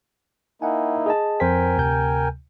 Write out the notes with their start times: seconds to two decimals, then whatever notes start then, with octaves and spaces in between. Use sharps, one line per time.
0.62 A#3 D#4 E4 F#5 G#5
1.06 G#4 D#5 A5
1.40 F2 A#4 C5 G5 G#5 B6
1.77 D2 C3 G6